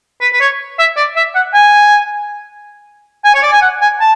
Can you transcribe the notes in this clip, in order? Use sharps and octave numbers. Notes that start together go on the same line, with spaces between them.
B4
B4
C#5
E5
D5
E5
F#5
G#5
G#5
C#5
D5
G#5
F#5
G#5
A5